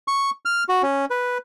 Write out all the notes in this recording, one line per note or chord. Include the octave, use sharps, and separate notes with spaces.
C#6
F6
F#4
C#4
B4